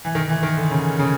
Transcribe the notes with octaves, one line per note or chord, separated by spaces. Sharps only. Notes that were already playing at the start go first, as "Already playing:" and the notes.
E3
D#3
E3
D#3
D3
C#3
C#3